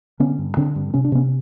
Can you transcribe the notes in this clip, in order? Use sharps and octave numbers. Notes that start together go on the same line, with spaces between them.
D3 B3 C#4
G2
D3 C4 D4
G2
C3 C#4
D4
C3 B3 C#4